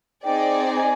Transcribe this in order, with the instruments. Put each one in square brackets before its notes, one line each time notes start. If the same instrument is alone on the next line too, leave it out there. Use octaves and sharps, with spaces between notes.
[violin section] C4 D#4 G#4 D5 [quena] G5
[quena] G#5